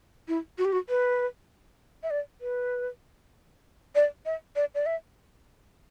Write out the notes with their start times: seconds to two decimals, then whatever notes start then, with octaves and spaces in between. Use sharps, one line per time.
0.28 E4
0.58 F#4
0.65 G4
0.72 F#4
0.89 B4
2.03 E5
2.11 D5
2.41 B4
3.95 D5
4.26 E5
4.56 D5
4.75 D5
4.86 E5